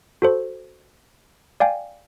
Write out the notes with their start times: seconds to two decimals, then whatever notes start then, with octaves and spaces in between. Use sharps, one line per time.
0.22 F#4 A4 C5
1.60 D5 F5 G5 G#5